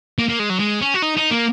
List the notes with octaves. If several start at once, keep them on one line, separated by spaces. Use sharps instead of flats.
A#3
A#3
G#3
F#3
G#3
C#4
F#4
D#4
D#4
A#3